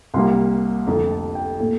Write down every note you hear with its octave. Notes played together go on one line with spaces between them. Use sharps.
C2 C3 G3 A#3 C6
F1 F2 D3 A3 A#5
A5
G5
A#2 A3